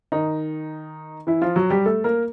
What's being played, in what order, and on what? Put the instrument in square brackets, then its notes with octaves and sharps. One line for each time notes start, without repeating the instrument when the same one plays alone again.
[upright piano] D#3 D#4
E3 E4
F3 F4
F#3 F#4
G3 G4
A3 A4
A#3 A#4